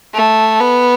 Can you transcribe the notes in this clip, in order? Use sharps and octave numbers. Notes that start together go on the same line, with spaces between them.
A3
B3